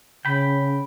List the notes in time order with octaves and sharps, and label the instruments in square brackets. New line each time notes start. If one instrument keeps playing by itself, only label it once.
[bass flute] C#3 [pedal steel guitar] G5 B5